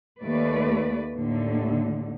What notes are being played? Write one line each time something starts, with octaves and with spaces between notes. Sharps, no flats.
D#2 A3 B4 D5
D#2 A2 D3